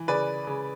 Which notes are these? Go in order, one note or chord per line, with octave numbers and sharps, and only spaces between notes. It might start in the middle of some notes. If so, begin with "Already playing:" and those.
Already playing: E3
C#3 B4 D5
C#3